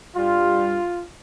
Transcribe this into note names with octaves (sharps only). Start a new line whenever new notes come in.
G2 G3 F4